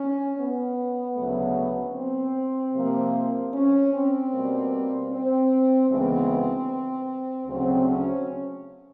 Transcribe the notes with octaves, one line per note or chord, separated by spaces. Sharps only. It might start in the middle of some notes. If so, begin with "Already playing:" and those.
Already playing: C#4
B3
D2 C#3 F#3 A3
C4
C3 F3 A#3
C#4
C4
B2 G3 A#3
C4
D2 C#3 E3 G#3 B3 C4
D2 C#3 F#3 C4
C#4